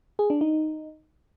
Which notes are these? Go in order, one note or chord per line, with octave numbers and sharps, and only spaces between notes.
G#4
D4
D#4